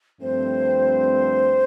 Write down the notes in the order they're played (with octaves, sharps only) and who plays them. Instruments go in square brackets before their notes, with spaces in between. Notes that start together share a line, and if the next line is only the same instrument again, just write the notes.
[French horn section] G2 F3 A3 C4 [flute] C5